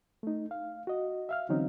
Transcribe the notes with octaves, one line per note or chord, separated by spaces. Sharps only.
A3 D#4
F5
F#4 D#5
E5 F5 F6
D3 E3 F#3 C4 C#4 D#4